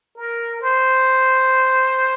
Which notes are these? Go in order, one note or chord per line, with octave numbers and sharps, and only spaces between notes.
A#4
C5